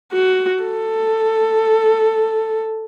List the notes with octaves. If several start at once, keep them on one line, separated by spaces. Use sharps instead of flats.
F#4
A4